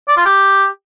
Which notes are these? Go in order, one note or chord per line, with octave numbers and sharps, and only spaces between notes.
D5
F4
G4